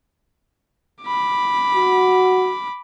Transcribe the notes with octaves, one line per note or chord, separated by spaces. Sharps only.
B5 D6
F#4